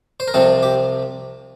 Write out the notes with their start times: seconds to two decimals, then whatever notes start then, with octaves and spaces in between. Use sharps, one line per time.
0.20 C5
0.28 A#4
0.34 C2 C3 F3 C4 A4
0.63 G4